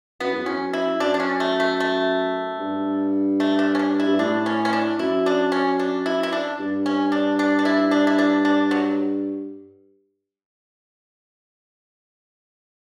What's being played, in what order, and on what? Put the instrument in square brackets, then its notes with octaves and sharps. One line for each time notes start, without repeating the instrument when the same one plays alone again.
[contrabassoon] F#2 [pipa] B3
[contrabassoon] E2
[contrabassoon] F#2 [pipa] C#4
[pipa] E4
[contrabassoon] F#2 [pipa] D4
[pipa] D4
C#4
A3
A3
A3
[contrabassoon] G2
[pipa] A3
D4
C#4
D4
E4
[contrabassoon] G2
[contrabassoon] A2 [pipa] D4
[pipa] C#4
C#4
D4
[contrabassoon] F#2 [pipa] E4
[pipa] D4
C#4
D4
E4
E4
D4
[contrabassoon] G2
[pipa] C#4
D4
D4
D4
E4
D4
E4
D4
D4
F#3